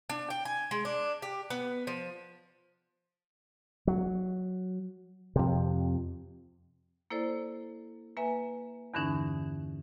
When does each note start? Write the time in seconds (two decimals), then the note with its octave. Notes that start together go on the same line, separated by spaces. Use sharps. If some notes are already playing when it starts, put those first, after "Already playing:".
0.10 D4
0.30 G5
0.45 G#5
0.71 G#3
0.85 D4
1.22 G4
1.50 B3
1.87 F3
3.87 F#3
5.36 F2 C3
7.10 A#3 E4 A4 C5 D5
8.17 A#3 B4 E5 G#5
8.94 E2 G2 D3 E3 C#4 D#4